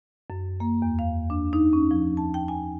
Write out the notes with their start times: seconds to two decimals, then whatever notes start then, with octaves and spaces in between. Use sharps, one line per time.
0.30 F#2
0.60 A#3
0.82 E2
0.99 F5
1.30 D4
1.53 D#4
1.73 C#4
1.91 F3
2.17 A5
2.34 G5
2.48 G#5